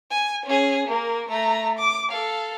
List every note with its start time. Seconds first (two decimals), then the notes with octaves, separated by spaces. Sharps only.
0.11 G#5
0.45 C#4 G#4
0.87 A#3 A#4
1.29 A3 A#5
1.79 D6
2.11 A4 F5